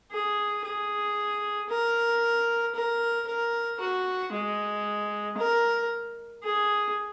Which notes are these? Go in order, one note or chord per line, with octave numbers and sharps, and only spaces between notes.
G#4
G#4
A#4
A#4
A#4
F#4
G#3
A#4
G#4